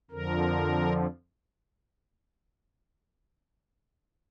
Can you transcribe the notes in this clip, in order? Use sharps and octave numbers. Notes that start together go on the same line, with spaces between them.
F2 D3 F3 A#4